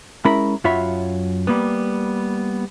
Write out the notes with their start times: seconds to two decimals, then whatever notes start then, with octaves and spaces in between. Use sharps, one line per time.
0.25 G#3 C#4 E4 A#4 B5
0.64 F#2 F#3 F4 C#5 E5 B5
1.47 G3 A#3 B3